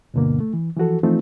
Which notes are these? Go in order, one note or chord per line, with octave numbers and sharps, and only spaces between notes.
D2 G2 B2 D3 A#3
A3
E3
E3 F3 F#4 A4
E3 F3 A3 C4 D#4 F4